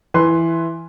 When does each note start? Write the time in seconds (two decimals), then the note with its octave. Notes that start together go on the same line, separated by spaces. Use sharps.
0.14 E3 B4 C6